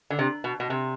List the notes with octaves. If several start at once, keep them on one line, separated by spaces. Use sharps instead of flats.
D3
C3
B2
B2
C3